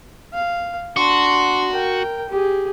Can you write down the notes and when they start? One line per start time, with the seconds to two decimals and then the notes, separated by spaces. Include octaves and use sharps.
0.34 F5
0.97 D4 F#4 C6
1.72 A#4 G5
2.30 G4 G#4